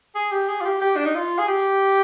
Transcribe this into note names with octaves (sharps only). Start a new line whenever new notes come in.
G#4
G4
G#4
F4
G4
G4
D4
D#4
F4
G#4
G4